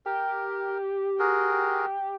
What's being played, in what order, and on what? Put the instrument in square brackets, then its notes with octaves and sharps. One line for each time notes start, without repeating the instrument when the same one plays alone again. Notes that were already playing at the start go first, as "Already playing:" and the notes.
[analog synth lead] G4 [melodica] A#4
[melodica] F#4 G#4 A#4